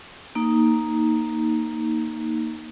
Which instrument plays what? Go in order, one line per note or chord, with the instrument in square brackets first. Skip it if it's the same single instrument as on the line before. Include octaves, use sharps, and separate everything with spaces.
[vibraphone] A#3 D#4